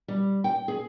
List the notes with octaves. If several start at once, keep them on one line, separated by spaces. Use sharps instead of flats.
G3
G5
G#4